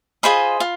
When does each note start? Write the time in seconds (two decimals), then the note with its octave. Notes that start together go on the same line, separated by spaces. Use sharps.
0.23 F4 G#4 C5 D#5 B5
0.60 F4